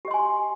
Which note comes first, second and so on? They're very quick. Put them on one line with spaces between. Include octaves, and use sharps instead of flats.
G4 D#5 C6 G#5